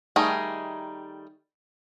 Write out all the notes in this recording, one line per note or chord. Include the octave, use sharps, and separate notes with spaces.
D#3 G3 A3 D#4 G#4